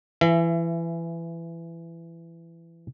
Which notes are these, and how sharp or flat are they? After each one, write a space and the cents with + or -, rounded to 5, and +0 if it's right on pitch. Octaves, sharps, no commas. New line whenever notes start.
E3 +20 E5 +35